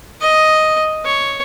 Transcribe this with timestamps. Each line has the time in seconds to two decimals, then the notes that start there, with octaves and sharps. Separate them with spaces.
0.21 D#5
1.05 C#5